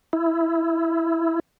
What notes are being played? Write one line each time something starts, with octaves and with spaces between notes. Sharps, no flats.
E4